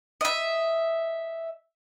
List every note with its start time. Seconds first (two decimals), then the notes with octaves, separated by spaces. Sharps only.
0.21 D#5 E5